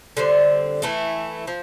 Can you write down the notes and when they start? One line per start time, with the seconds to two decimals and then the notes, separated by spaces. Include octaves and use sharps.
0.17 D3 G3 C4
0.82 E3 A3 E4
1.47 F3